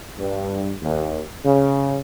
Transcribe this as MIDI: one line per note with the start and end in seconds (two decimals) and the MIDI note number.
0.19 0.73 43
0.82 1.23 39
1.45 2.00 49